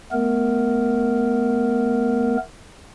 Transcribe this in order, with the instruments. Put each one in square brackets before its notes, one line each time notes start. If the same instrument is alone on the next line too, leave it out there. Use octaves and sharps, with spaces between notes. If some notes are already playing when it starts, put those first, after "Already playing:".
[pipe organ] A3 B3 A#4